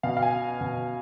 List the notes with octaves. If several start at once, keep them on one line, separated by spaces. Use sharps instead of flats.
B2 F5
F5
G#5
B2